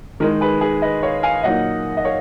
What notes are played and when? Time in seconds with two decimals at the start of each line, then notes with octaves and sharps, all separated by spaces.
0.20 D#3 G#3 D#4 A#4
0.41 G#4 B4
0.61 G#4 B4
0.82 B4 D#5
1.03 C#5 F5
1.23 F5 G#5
1.43 A#2 F#3 A#3 D#4 D#5 F#5
1.97 D#5
2.05 C#5 F5